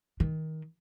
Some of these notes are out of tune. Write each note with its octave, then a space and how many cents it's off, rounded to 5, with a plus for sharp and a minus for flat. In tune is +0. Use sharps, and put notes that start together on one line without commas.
D#3 +20